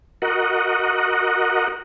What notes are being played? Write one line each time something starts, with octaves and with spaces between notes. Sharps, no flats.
F#4 A#4 D#5 F#5